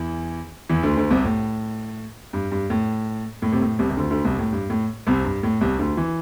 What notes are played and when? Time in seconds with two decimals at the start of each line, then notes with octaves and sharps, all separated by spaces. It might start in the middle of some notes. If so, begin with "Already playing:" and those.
Already playing: E2 E3
0.69 E2 E3
0.83 D2 D3
0.97 D2 D3
1.10 C2 C3
1.24 A2
2.33 G2
2.52 G2
2.70 A2
3.42 A2
3.52 C3
3.61 A2
3.79 C2 C3
3.90 C3
3.97 D2 D3
4.10 D2 D3
4.25 C2 C3
4.39 A2
4.52 G2
4.70 A2
5.07 C2 C3
5.25 G2
5.43 A2
5.61 C2 C3
5.79 D2 D3
5.97 E3